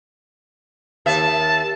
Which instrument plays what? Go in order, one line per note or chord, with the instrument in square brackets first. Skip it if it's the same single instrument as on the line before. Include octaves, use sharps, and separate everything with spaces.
[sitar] D#2 E5 [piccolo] A5